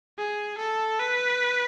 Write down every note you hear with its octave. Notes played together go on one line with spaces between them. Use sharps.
G#4
A4
B4